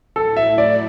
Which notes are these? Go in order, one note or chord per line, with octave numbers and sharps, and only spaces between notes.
A2 F#3 A3 E4 A4
E5
D5